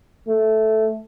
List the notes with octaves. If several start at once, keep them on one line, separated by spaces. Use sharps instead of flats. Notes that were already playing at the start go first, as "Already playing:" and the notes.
A3